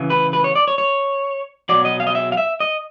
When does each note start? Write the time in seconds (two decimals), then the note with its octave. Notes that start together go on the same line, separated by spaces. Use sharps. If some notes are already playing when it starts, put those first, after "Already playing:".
Already playing: C#3 E3
0.10 B4
0.33 B4
0.44 C#5
0.55 D5
0.68 C#5
0.78 C#5
1.69 B2 F#3 D5
1.85 D#5
2.00 F5
2.07 D#5
2.15 E5
2.32 F5
2.37 E5
2.60 D#5